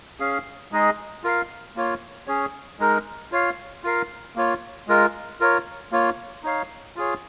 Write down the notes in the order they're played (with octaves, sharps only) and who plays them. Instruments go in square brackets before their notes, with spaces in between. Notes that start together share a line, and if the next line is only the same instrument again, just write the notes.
[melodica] C#4 G#4 F5
G#3 D#4 G#4 D#5
F4 A#4 F5
A#3 F4 C#5
C#4 G#4 C#5
G#3 D#4 A#4
F4 C#5 F5
F4 A#4 F5
A#3 F4 C#5
G#3 F4 A#4
F4 A#4 C#5
A#3 F4 C#5
D#4 C#5 F5
F4 G#4 C#5